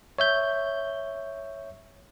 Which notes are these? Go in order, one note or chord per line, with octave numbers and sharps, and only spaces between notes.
C#5 E5 G6